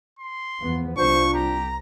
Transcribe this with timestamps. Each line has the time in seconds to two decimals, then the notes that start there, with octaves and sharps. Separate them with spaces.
0.19 C6
0.61 E2 F3 B3
0.97 C2 D4 F4 C5 C#6
1.34 G4 A#5